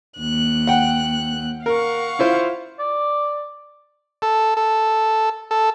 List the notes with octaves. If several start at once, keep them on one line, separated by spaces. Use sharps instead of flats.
D#2 F#6
F#5 G5
A#4 F5 F#5 C#6
E4 F4 C5
D5
A4
A4
A4